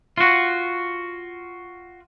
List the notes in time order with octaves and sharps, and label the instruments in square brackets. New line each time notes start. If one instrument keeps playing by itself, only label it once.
[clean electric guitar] F4 F#4